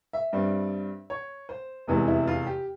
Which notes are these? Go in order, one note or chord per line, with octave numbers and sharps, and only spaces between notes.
E5
G2 G3 C4
C#5
C5
F1 E2 C3 E3 G#3
E4
F4
G4